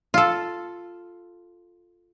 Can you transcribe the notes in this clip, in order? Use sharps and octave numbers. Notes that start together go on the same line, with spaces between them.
F4 A4